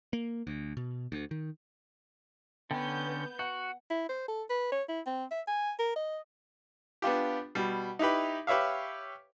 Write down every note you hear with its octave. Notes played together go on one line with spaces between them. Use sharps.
A#3
D2
B2
D2
D#3
D3 B3 C#4 G5 G6
F#4 F#5
E4
C5
A4
B4
C#5
E4
C4
E5
G#5
A#4
D#5
B3 D4 F4 G4
B2 G3
D#4 E4 G4 B4
G4 B4 C#5 E5 F5